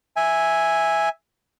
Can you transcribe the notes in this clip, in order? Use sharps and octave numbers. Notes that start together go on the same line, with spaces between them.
E5 G#5